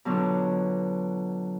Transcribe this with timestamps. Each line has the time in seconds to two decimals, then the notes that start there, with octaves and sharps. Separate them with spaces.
0.05 B2 D3 F#3 D4 F4